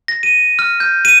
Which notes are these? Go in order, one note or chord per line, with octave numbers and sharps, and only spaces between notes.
A#6
D#7
F6
G6
D#7